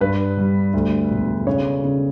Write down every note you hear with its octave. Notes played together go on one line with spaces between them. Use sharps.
G2 B4
G3
D2
E1
C#3 C#5
C#3